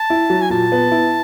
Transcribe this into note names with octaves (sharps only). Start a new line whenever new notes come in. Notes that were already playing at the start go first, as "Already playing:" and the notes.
Already playing: A5
E4
F#3
G#5
A#2 A5
B3
E4